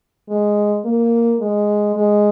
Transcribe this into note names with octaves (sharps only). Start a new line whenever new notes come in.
G#3
A#3
G#3
G#3